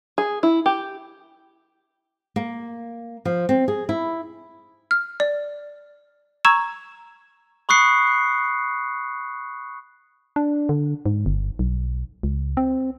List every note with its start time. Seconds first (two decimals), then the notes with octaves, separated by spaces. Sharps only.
0.18 G#4
0.43 E4
0.66 G4
2.36 A#3
3.25 F3
3.49 C4
3.68 G#4
3.89 E4
4.91 F6
5.20 D5
6.45 A#5 C#6 E6 G#6 E7
7.69 B5 C#6 D#6 F#6 C7 C#7
10.36 D4
10.69 D3
11.06 G#2
11.26 G1
11.59 B1
12.23 C#2
12.57 C4